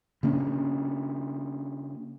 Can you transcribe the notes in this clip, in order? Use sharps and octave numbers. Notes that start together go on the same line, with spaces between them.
C#3 A#3 C#4 D4